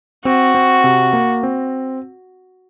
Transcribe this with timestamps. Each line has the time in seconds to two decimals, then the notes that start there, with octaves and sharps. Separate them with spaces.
0.25 C4 F#4
0.55 C4
0.84 C3
1.13 A#3
1.43 C4